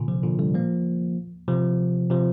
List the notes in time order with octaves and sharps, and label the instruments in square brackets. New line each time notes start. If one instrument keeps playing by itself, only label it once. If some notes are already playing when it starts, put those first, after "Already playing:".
Already playing: [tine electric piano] A#2 D3
C3 F3
A#2 D3
D3 G3
F3 A#3
C3 F3
C3 F3